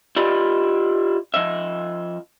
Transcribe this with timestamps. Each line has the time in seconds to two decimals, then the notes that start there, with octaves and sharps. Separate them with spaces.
0.16 E4 F4 G4 B4 D5 D#5
1.34 F3 D#5 E5